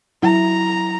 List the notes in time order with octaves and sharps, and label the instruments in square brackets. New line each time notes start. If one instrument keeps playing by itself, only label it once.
[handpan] F#3 E4 [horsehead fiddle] A#5